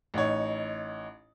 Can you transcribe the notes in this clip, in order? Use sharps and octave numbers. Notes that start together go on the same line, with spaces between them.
A1 D#4 C#5